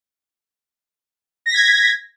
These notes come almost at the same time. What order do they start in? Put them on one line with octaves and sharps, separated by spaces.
A#6 B6 G#6